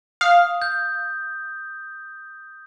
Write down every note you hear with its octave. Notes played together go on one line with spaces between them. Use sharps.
F5 D#6
G6